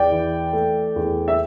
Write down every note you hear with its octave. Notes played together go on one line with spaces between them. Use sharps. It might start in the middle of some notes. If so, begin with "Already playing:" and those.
Already playing: E2 D5 G5
E3
A3
E2
E5